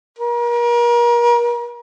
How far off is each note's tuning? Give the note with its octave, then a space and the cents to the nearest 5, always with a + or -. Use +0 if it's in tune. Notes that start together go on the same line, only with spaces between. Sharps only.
A#4 +35